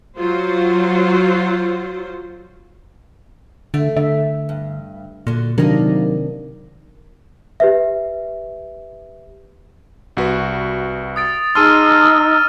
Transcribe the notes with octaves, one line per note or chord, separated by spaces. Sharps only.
F#3 F4 F#4 C5
D3 A3
D3 E5
G2
A#2 D3 F#3
C3 D#3 F#3 A#3 D4 D#4
G4 B4 E5
C2 F#4 B4
D#6 A6 D7
D#4 G#4 A5 C6 E6 F6 D#7